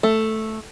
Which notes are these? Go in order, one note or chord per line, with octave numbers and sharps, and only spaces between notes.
A3